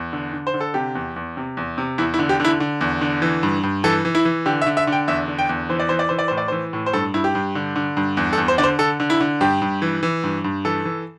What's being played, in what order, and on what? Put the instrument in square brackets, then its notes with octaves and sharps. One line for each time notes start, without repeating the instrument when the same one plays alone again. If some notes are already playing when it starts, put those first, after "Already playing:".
Already playing: [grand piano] E2
D3
D3
C5
D3
A4
C3 G4
E2
E2
C3
E2
C3
E2 E4
E4
D3
G4
D3 E4
D3
E2
D3
E3
G2
G2
E3 A4
E3
E4
E3
D3 G4
E5
D3
E5
D3
G5
E2 E5
D3
G5
E2
E3 C5
D5
E3 C5
D5
E3 C5
D5
A2 C5
D5
E3 C5
A2
C5
G2 A4
G2 E4
G4
G2
D3
D3
G2
E2
A4
E2
C5
D3 D5
C5
D3 A4
D3
E4
D3
G2 G4
G2
E3
E3
G2
G2
E3 A4
E3